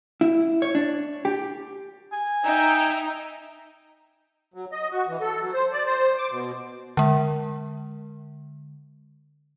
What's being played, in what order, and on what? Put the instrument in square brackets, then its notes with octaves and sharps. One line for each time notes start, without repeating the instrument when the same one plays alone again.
[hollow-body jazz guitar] E4
C#5
D4
G4
[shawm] G#5
[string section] D#4 [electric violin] E5 G5
[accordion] F#3
D#5
F#4
E3
A4
F#3
C5
D5
C5
D6
B2
[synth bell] D3 G#3